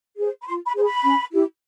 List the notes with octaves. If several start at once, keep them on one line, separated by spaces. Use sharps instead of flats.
G#4 C5
B5
F4 C6
B5
G#4 C5
B5
C#4
E4 G4